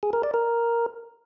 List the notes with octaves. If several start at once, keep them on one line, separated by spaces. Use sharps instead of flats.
G#4
A#4
D5
A#4